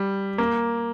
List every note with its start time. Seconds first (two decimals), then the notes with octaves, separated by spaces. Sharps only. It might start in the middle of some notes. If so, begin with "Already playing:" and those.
Already playing: G3
0.38 A#3